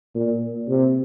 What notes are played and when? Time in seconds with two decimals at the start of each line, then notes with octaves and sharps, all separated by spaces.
0.15 A#2
0.69 C3